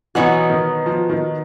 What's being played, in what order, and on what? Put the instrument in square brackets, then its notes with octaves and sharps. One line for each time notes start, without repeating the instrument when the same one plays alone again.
[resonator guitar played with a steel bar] B2 F#3 B3 D#4 F#4 [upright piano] E3
[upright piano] D#3
F3
D#3